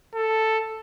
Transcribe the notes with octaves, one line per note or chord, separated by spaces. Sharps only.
A4